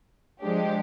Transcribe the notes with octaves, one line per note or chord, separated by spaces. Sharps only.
F3 G#3 D4 G4